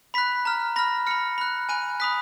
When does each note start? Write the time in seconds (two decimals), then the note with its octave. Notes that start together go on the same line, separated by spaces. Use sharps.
0.14 B5 F#6 B6
0.45 A#5 F6
0.76 B5 F6 A#6
1.07 B5 F6 C#7
1.38 B5 F#6
1.69 G#5 B5 F#6 D#7
2.00 B5 D#6 F#6 B6